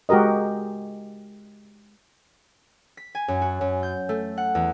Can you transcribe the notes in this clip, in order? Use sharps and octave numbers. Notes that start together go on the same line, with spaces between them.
G#3 F#4 G4 A#4 D#5
B6
G#5
F#2
F#4
F#2
G6
A3
F#5
E2